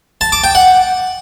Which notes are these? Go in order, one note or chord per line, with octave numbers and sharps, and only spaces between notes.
A5
D6
G5
F#5